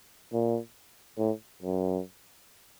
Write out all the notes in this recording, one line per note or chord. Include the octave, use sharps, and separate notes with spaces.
A#2
A2
F#2